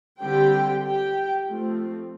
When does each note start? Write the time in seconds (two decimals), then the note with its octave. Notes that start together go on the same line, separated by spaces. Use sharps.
0.21 D3 G3 C4 G4 G5
0.84 G4 G5
1.47 F3 A3 C4